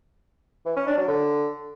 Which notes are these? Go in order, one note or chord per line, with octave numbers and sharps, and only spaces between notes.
E3
C#4
D4
F#3
D3